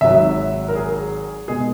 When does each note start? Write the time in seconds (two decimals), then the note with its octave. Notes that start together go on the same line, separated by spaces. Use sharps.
0.01 G#1 G#2 F#3 E5
0.68 A#4
0.75 G#4
1.48 B2 G#3 G#4